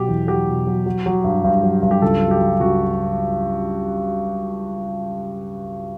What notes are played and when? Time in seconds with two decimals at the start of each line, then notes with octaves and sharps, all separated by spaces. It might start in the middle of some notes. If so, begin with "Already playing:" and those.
Already playing: B2 F#3 G4
0.08 E2
0.27 F#3 G4
0.47 B2
0.67 F#3
0.86 F#3
1.06 F#3
1.24 G2
1.44 G2
1.63 F#3
1.82 G2
1.91 G4
2.02 C#2 A4
2.22 F#3
2.31 G4
2.41 F#3
2.60 C#2 F#4